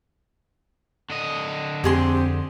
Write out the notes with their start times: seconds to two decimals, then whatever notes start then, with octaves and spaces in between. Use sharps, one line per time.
1.10 D3 D#5
1.84 F2 C4 G4 G#4 C6